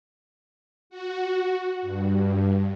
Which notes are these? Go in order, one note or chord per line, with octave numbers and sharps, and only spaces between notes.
F#4
G2